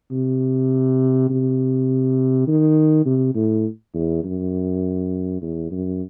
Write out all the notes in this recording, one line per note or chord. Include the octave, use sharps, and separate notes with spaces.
C3
C3
D#3
C3
A2
E2
F#2
E2
F#2